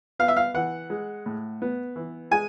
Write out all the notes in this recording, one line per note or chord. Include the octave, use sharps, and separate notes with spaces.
B3 F5
E5
F5
E3 F#5
G#3
A2
B3
E3
G#3 G#5